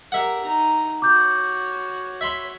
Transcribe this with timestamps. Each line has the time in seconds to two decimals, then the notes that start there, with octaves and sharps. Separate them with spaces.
0.12 G4 A#4 E5 F#5
0.43 D#4 A#5
1.02 F#4 C#5 D6 G6
2.21 E5 B5 C6